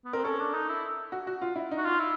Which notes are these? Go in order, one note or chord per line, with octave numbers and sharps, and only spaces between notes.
B3
C4 A#4
C#4 A4
D4
D#4
E4
F#4
F#4
F4
E4
D#4
F#4
F4
E4